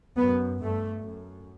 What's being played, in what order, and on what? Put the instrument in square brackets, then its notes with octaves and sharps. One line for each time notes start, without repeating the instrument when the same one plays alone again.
[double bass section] F#2 B3
G2 A3
F#2